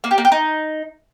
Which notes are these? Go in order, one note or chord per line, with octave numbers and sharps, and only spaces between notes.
A#3
G4
A#3
G4
D#4